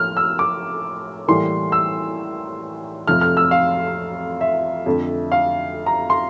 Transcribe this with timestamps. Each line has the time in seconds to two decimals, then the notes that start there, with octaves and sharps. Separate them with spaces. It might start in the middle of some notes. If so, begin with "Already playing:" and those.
Already playing: A2 F3 A#3 F6
0.17 E6
0.39 D6
1.28 A2 E3 G3 A#3 C6
1.72 E6
3.08 F2 C3 F3 A3 F6
3.21 F6
3.37 E6
3.51 F5
4.41 E5
4.86 F2 D3 A3
5.32 F5
5.86 A#5
6.10 C6